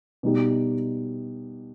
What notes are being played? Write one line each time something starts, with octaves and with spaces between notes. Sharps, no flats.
B2 G3 D#4 G4